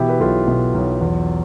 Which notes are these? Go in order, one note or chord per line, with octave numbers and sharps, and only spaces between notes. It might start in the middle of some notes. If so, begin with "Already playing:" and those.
Already playing: B2 E3 E4 G4
B4
B1 F4 A4
B2
B1
E2